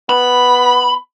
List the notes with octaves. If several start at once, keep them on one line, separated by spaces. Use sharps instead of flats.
B3 B5